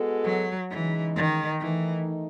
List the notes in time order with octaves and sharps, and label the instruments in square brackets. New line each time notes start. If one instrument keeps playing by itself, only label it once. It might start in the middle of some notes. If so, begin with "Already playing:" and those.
Already playing: [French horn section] G#3 B3 F#4 A4
[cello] F#3
[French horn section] C#3 G#3 D#4 [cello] E3
[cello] D#3
[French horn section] D#3 A3 D#4 [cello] E3